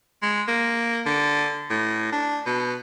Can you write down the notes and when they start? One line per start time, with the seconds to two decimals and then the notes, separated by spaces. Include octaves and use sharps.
0.22 G#3
0.48 A#3
1.06 D3
1.70 A2
2.12 D4
2.46 B2